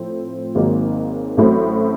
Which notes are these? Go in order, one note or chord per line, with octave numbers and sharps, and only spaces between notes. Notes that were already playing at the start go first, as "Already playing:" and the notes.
Already playing: A2 F3 A3 C4
G#1 G#2 D#3 F#3 A#3
A1 A2 F#3 A3 C4